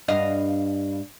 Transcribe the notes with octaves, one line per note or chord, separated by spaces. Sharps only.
G2 D#5 F5